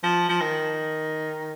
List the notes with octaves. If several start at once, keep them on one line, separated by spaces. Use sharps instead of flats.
F3
F3
D#3